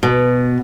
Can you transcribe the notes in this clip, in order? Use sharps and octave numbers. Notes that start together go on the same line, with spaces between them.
B2